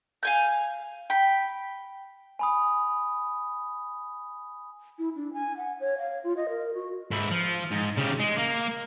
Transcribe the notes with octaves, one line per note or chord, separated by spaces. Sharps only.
F5 G#5 G6
G5 B5
G#5 B5 D#6
E4
D4
G#5
F#5
C#5
F5
F4
D#5
A#4
F#4
G#2 E4
F3
G#2
C#3 G4
G#3
A#3